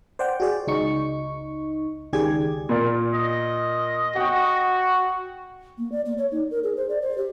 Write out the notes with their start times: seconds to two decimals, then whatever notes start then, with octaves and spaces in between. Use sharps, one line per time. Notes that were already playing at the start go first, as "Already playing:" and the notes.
0.19 C5 D5 F#5 G5
0.40 F#4 G#4 D5
0.67 C#2 D#4 C#6
2.13 C#2 D#3 G4 G#4 D5 G#6
2.69 A#2 A#4 D5
3.13 D#5
4.16 F#4 F#5 G5
5.78 A#3
5.92 D5
6.06 A#3
6.18 C#5
6.32 D#4
6.51 A#4
6.64 G#4
6.77 C5
6.89 D5
7.02 C5
7.18 G4